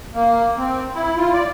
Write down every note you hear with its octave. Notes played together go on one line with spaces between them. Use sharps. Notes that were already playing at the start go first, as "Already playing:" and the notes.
A#3
C4
E4
F4
D5